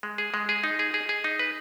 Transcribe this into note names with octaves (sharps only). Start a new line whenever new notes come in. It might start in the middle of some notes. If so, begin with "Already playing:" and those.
G#3
G#4
G#3
G#4
D#4
G#4
G#4
G#4
D#4
B4